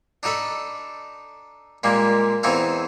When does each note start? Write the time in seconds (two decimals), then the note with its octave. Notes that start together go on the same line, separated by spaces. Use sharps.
0.23 D4 D#4 F#4 A4 B5
1.83 A#2 G3 G#3 A#3
2.43 E2 E3 C4 D#4 F#4 F5